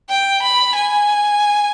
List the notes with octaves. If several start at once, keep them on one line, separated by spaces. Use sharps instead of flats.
G5
B5
G#5